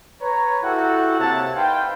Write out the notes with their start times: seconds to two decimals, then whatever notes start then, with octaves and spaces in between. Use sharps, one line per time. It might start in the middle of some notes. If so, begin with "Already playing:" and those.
0.21 B4 C#5 A#5
0.63 E4 F#4 G4 A4 F#5
1.19 C3 A#3 C#5 E5 F#5 A5
1.56 D#4 B4 C5 F5 G5